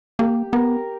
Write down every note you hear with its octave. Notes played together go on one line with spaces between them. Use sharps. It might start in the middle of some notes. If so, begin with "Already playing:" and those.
A#3 G4
B3 A#4